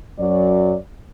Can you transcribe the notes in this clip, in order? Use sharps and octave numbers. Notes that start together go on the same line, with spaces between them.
F#2 F#3 D5